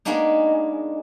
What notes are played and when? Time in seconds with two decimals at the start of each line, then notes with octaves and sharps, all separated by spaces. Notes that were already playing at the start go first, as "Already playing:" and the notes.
0.05 G#3 A#3 B3 D4 D#4